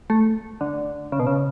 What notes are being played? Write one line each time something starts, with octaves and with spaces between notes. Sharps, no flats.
A3
D3
C#3
B2
C#3